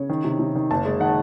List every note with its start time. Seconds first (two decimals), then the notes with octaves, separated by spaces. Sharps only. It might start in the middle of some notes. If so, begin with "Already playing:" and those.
Already playing: C#3 C#5
0.10 D#3
0.24 C3
0.39 C3
0.55 D#3
0.71 F#1 A5
0.85 G#3
1.00 D#3 F#5